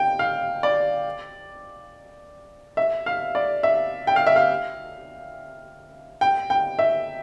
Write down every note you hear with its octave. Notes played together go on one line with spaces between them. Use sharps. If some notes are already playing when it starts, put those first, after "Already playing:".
Already playing: G5
F5
D5
E5
F5
D5
E5
G5
F5
E5
F5
G5
G5
E5